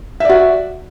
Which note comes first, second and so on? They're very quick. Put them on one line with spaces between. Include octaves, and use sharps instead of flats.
E5 D5 F#4